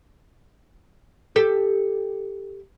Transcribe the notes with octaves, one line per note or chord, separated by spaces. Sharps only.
G4 A4